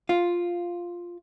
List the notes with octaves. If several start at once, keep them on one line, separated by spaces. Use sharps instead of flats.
F4